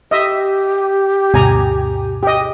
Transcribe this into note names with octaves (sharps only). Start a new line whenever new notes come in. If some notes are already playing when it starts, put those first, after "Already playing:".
G4 D#5 E5
D2 G2 B2 G#5 A#5
G4 D#5